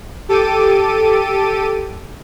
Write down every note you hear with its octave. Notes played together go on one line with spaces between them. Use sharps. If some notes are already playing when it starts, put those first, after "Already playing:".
G4 A4 D6 D#7